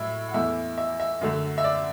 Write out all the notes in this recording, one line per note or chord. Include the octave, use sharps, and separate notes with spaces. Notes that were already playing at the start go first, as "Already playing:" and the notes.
Already playing: A2 F#3 E5
F#5
E2 E3 A3 E5
E5
E5
F#2 D3 A3
E5
D5